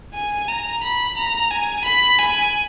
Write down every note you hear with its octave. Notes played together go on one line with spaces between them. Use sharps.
G#5
A#5
B5
A#5
G#5
B5
G#5